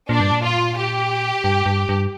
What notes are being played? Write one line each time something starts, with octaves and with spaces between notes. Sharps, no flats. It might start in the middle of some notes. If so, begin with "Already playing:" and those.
A#2 D4
G2
A#2
F4
G4
G2
G2
G2